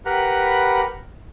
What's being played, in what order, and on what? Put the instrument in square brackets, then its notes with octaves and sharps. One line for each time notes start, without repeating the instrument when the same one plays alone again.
[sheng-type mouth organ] G4 A#4 B4 F#5 A#5 B5